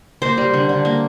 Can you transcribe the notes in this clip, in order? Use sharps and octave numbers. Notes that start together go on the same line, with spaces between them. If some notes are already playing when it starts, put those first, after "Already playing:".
A#3 C5
G3
D3
D3
A#3